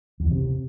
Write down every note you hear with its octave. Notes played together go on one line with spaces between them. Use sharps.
E2
D#3
C3